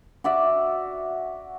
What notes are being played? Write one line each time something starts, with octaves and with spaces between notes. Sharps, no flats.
F#4 D5 E5